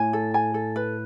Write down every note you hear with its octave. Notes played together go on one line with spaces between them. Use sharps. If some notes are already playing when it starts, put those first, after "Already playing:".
Already playing: A2 G#5
A4
G#5
A4
B4